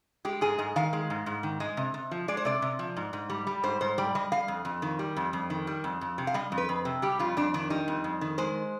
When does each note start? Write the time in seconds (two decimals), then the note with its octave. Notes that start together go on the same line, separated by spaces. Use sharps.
0.25 G#3 G4
0.41 G#2 G#4
0.58 G#2 D#5
0.76 D#3 F5
0.93 G#3
1.10 G#2
1.26 G#2
1.43 D#3
1.60 G#3 D#5
1.77 C3
1.94 C3
2.11 F3
2.28 G#3 D5
2.37 C5
2.45 C3 D5
2.62 C3
2.79 F3
2.97 G#2
3.13 G#2
3.30 G3
3.47 G3
3.63 G#2 C5
3.81 G#2 C5
3.98 G3 D5
4.15 G3 D#5
4.32 G3 F5
4.48 F2
4.65 F2
4.82 D#3
4.99 G3
5.16 F2
5.33 F2
5.50 D#3
5.67 G3
5.84 F2
6.01 F2
6.18 C3
6.27 F5
6.34 G3 D#5
6.52 F2
6.58 B4
6.69 F2
6.85 C3
7.02 G3 G4
7.19 F2 F4
7.37 F2 D4
7.54 D#3 D4
7.70 G3 D#4
7.88 F2
8.04 F2
8.21 D#3
8.38 G#3 C5